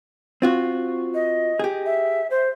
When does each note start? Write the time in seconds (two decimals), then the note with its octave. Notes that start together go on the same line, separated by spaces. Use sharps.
0.42 C4 F4 F#4
1.14 D#5
1.59 G4 G#4
1.86 E5
2.31 C5